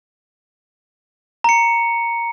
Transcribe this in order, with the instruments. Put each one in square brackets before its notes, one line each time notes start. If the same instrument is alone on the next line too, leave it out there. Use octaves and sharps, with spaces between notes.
[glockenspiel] A#5 C#7